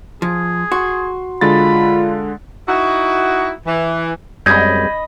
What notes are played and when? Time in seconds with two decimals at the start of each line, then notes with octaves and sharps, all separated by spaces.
0.22 F3 G#4
0.72 F#4 C6
1.41 D3 G#3 F4 B5 A6
2.69 D#4 E4 F#4
3.67 E3
4.46 F#2 G3 G#3 C4 D#5 B5 G6 G#6